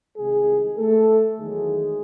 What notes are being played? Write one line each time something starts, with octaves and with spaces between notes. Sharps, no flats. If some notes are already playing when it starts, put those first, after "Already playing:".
C2 C3 D#3 G#3 G#4
A3 A4
E2 D#3 F#3 G#3 A3 G#4